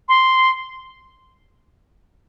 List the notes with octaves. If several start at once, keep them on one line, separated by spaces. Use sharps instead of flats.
C6